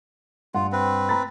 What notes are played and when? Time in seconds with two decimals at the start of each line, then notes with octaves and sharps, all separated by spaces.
0.54 G2 F4 F#5
0.72 C4 B4
1.09 A#5 B5 A6